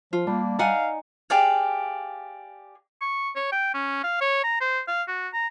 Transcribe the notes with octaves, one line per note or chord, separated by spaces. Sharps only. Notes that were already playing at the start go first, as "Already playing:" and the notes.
F3 F4
G3 A#3 D4
D#4 D5 F5 F#5 G#5
G4 G#4 D5 F5
C#6
C#5
G5
C#4
F5
C#5
A#5
C5
F5
F#4
A#5